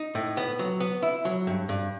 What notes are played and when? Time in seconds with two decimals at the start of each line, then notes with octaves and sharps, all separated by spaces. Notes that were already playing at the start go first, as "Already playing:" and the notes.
Already playing: D#4
0.15 A2
0.37 B3
0.59 F#3
0.80 B3
1.03 E4
1.25 F#3
1.47 G2
1.69 G2